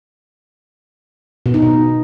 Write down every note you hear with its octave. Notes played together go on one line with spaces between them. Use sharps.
B2
D#4
B2